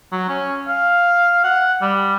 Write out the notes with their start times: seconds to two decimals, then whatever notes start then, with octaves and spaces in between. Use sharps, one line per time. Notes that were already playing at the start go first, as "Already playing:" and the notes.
0.12 F#3
0.29 C#4
0.68 F5
1.44 F#5
1.81 G3